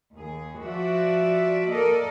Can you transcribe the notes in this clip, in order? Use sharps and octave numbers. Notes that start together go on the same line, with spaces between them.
D#2 G#4
F3 F#4 D5 E5
A#3 A4 A#4 D5 D#5